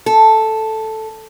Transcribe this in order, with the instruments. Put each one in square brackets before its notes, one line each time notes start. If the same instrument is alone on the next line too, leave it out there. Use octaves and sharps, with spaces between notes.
[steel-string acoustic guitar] A4